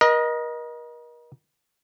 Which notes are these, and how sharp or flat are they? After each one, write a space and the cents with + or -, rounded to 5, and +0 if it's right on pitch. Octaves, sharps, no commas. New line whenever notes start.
A#4 +40 D#5 +0